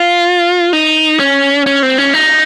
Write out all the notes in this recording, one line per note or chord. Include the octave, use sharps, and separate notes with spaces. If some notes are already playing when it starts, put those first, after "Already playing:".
Already playing: F4
D#4
C#4
C#4
C4
C#4
D#4